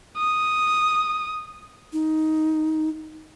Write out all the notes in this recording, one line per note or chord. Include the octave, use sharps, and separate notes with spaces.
D#6
D#4